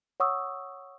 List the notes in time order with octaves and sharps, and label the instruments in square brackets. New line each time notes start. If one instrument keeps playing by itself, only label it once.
[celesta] C#5 F#5 C#6 D#6 E6